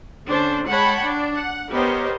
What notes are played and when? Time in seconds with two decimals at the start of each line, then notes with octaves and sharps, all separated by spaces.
0.29 D3 C#4 D4 C5
0.69 G#3 C#5 F#5 G5 A5 B5
1.03 D4
1.38 F#5
1.72 B3 G4 A#4 C5 C#5 D#5